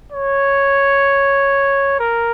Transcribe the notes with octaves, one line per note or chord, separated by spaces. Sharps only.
C#5
A#4